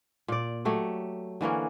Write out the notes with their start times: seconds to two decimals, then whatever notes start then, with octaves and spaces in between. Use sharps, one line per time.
0.28 A#2 D5
0.65 F#3 A3 G4
1.41 D3 E3 A#3 C#4